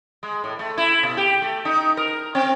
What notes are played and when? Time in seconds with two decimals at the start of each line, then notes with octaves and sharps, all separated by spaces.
0.23 G#3
0.44 A2
0.59 A3
0.77 E4
1.03 B2
1.17 G4
1.42 A3
1.65 D#4
1.97 A#4
2.35 C4